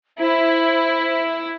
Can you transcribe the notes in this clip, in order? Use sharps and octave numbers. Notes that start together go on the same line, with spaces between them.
E4 C5